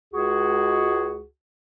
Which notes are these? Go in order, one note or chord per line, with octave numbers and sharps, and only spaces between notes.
C#2 F#4 G#4